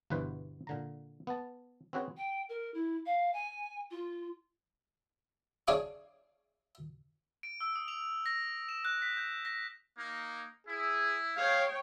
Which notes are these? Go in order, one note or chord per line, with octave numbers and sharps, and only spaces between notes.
G1 G2 B2 E3 B4 C5
A#2 D3 A#5
B3 A5
C4 C#4 F#4 G#4 B4 C#5
G5
A#4
E4
F5
G#5
F4
D4 G#4 C#5 F5 D6
D7
E6
D#6
F7
A#6
E7
F#6
B6
G6
A#6
A#3 D#4
E4 G#4
G#4 C#5 F5 G5